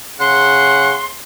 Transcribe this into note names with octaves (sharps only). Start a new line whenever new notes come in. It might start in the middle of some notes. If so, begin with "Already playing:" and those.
C#3 F#5 C6